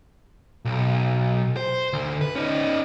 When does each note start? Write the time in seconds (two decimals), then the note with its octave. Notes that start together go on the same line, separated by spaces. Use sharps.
0.65 B1
1.57 C5
1.93 D2
2.21 B4
2.35 C#4 D#4